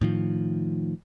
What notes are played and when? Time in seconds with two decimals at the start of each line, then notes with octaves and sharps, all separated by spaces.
0.01 A2 D#3 F3